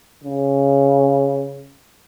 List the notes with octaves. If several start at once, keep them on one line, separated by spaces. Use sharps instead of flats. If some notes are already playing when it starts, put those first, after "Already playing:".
C#3